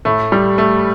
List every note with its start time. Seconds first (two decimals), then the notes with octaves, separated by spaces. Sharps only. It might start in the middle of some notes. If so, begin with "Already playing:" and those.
0.05 A2 A3
0.32 G3
0.58 A3